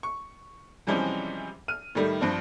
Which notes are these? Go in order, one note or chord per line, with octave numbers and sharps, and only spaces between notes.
C#6
C3 E3 F3 G3 G#3 C#4
F6 D#7
A2 D#3 G3 A3
G2 F3 C4 D4